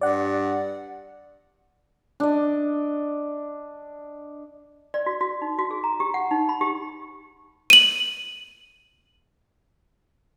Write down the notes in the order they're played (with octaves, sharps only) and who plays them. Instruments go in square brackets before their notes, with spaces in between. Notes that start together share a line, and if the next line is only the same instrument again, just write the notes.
[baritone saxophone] G2 [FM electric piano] D5 F#5
[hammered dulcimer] D4 D#5
[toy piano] D5
F#4
F#4
D#4
F#4
G#4
A#5
G4
F#5
D#4
B5
G4
[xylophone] D#7 F#7